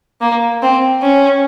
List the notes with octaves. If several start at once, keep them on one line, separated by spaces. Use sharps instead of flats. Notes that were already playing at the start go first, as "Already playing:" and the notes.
A#3
C4
C#4